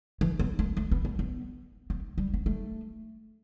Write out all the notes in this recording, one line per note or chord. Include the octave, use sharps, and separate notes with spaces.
E3
B3
A3
A3
B3
B3
B3
B3
G3
B3
A3